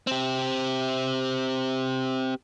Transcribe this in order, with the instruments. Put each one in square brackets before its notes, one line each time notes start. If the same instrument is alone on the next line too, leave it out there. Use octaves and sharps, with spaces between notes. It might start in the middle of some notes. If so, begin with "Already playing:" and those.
[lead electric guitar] C4 G4